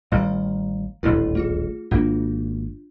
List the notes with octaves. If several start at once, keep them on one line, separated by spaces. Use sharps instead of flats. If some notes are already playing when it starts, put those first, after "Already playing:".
A1 D#3 G3 F5 A#5
D#1 A1 D2 E4 A#4
A3 F4 G#4
G#1 A#3 D4 F4